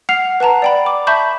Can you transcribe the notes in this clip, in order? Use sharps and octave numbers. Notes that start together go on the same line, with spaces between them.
F#5 F6 C7 F7
B4 F#5 A5 A#5
D5 G5 B5
D6
E5 A5 B5 C#6 G6